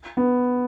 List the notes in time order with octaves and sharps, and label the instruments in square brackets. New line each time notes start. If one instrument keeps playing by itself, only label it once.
[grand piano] B3